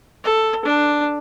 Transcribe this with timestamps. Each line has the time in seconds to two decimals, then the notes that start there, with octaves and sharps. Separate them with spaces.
0.24 A4
0.65 D4